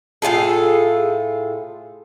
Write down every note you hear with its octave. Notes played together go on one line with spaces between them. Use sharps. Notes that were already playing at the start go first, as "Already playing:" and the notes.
A2 F4 G#4 A4